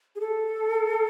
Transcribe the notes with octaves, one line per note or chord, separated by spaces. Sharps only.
G#4
A4